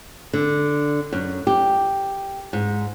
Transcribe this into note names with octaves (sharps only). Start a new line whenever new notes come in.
D3
F#2
G4
G#2